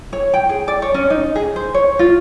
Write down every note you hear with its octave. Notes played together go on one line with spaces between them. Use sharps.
C#5
G5
G#4
D5
C#5
C#4
D#4
G#4
C5
C#5
F4